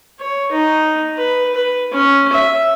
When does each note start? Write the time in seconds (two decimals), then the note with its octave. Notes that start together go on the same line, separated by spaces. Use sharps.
0.20 C#5
0.52 D#4
1.17 B4
1.54 B4
1.92 C#4
2.33 E5